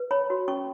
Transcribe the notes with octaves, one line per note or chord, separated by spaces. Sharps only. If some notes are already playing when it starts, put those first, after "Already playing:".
Already playing: B4
C#5 B5
F#4
C#4 C#6